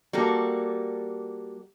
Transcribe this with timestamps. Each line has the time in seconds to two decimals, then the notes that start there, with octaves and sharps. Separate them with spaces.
0.13 G3 A#3 F#4 A4